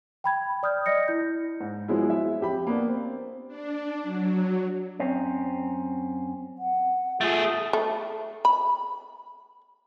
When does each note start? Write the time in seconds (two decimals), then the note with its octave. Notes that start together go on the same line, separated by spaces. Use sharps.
0.24 G5 B5 G#6
0.63 D5 D#6 F6 G6
0.86 D5 D#5 A#6 C#7
1.08 E4 G6
1.60 G#2
1.88 F3 F#3 G#3 B3 E4
2.10 E5
2.41 F2 G4 B5
2.67 A#3 B3 D4
2.88 C4
3.48 D4
4.03 F#3
5.00 F#2 C4 C#4
6.59 F#5
7.21 A3 F4 G#4
7.73 A3
8.45 B5